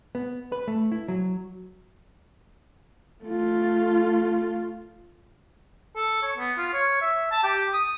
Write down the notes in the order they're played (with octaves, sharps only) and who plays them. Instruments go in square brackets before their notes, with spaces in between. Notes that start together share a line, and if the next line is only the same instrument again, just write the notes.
[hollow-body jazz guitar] B3
B4
A3
E4
F#3
[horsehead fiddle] A3 F4
[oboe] A4
C#5
B3
F4
C#5
E5
A5
G4
D#6